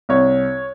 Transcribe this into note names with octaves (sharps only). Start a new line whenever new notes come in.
C2 C#5